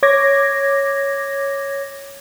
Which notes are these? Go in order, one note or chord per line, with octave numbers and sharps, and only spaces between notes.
C#5 D6 G#6 A#6